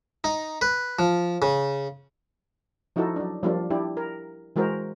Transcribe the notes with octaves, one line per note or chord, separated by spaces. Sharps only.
D#4
B4
F3
C#3
F3 D#4 E4 F#4 A4
F#3 D4
F3 G3 A#3 D4 F4
D4 E4 G4
A#4
E3 G#3 F#4 A#4 C5